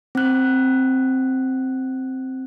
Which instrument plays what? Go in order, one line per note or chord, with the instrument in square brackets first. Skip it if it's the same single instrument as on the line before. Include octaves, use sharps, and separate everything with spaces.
[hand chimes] C4 F#6